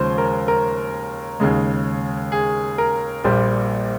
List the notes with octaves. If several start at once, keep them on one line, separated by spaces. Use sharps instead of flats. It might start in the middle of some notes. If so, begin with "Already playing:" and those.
Already playing: D#2 C#3 F3 G#3 C5
A#4
A#4
D#2 C#3 G#3
G#4
A#4
A#1 A#2 G3 C5